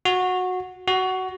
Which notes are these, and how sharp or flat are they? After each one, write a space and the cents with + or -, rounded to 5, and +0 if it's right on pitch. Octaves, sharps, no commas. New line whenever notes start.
F#4 -15
F#4 +15